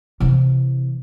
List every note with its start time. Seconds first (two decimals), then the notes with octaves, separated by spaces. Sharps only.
0.20 C3 E3